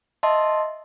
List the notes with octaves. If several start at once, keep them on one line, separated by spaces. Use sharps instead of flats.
D#5 E5 A5 C6